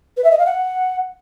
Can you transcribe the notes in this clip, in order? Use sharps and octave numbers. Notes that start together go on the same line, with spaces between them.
B4
E5
D#5
F5
F#5